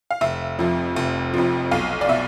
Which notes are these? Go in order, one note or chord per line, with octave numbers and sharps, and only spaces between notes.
F5
F1 E5
F2 C3 F3
F1
F2 C3 F3
B1 F5
D5
B2 E5